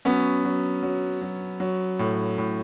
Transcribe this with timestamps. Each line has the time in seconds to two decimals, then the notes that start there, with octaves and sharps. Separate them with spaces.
0.05 F#3 B3 C#4
0.44 F#3
0.83 F#3
1.22 F#3
1.60 F#3
1.99 A2
2.38 A2